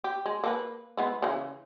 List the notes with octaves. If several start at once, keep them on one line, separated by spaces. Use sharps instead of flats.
G4
G#3
A#3 A4 B4
G#3 B3 E4
C#3 E3